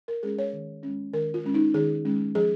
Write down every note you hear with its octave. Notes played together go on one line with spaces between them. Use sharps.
A#4
G#3 C#4 G#4
C#5
D#3
G#3 C#4
D#3 A#4
F4
G#3 C#4
D#4
D#3 G#4
G#3 C#4
F3 G#4